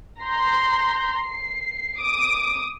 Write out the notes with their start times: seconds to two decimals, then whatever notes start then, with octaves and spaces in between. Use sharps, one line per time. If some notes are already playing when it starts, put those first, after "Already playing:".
0.21 A#5 C6 G6
1.18 C7
1.99 D6 D#6 D7